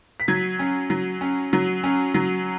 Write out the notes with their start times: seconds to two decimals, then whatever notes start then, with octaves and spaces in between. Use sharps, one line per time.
0.20 B6
0.28 F#3 G#6
0.59 C#4
0.90 F#3
1.21 C#4
1.53 F#3
1.83 C#4
2.14 F#3